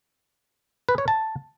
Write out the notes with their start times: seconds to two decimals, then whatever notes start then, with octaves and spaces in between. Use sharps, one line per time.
0.89 B4
0.98 C#5
1.08 A5